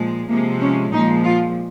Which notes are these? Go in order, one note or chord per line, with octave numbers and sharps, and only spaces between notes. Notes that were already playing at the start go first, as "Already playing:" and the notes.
Already playing: A#2 F3 G#3
C3 F3 G#3 A#3
C#4
A#2 F3 G#3 D#4
F4